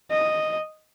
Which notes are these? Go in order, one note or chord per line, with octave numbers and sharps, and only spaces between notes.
D#5